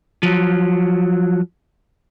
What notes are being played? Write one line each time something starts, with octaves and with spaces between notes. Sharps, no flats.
F3 F#3